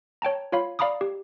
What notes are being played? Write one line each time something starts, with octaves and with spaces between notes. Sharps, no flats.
C#5 G5 A5 A#5
F4 C#5 F5 B5
D5 F5 A#5 B5 D6 D#6
G4